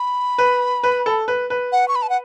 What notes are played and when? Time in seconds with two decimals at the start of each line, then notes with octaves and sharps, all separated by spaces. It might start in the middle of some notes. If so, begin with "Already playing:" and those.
Already playing: B5
0.38 B4
0.83 B4
1.06 A4
1.28 B4
1.50 B4
1.72 F#5
1.88 C#6
1.96 B5
2.02 A5
2.10 F#5